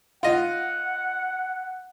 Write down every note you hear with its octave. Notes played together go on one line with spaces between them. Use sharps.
F4 D#5 F#5